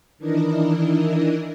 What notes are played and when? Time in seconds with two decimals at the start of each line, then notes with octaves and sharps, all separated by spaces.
0.18 D#3 E3 D4 E4 A#4 D#5